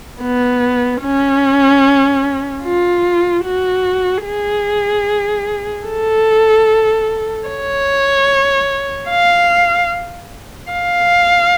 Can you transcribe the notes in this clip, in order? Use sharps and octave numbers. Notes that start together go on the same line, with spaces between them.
B3
C#4
F4
F#4
G#4
A4
C#5
F5
F5